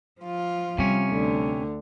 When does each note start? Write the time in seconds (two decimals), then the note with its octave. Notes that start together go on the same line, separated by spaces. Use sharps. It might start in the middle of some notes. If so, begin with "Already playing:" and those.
0.21 F3 F4
0.78 C3 G3 C#4
1.10 D2 D3